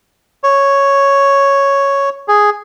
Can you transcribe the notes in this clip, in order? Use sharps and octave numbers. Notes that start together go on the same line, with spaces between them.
C#5
G#4